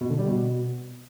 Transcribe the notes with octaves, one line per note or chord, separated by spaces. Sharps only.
B2
D3
G3
B2